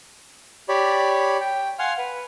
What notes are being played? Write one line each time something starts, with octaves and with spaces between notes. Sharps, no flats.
G4 C#5 D5 B5
G5
F5 F#5 G#5 C6 F6
B4